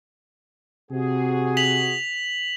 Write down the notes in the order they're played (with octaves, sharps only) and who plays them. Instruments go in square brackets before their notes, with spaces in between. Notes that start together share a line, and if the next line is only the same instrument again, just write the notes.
[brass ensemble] C3 F#4 G#4
[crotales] B6 F7 F#7